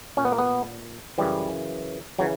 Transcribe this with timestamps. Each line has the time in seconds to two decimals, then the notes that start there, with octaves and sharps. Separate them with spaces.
0.17 A#2 C#4
0.25 B3
0.32 A#3
0.38 B3
1.18 F#2 C#3 E3 G3
2.19 C#3 E3 F#3